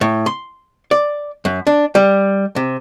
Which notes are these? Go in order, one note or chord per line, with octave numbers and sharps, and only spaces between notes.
A2
C6
D5
F#2
D4
G3
C3